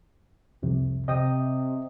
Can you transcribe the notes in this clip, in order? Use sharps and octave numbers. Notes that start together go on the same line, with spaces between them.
C2 F2 C3
C3 D#5 G5 D#6